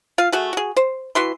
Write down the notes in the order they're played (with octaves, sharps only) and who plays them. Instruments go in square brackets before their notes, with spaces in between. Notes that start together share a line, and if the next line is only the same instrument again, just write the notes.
[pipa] F4 F5
A3 F#4 G#4
F#4 G#4
C5
E3 F#4 E5 C6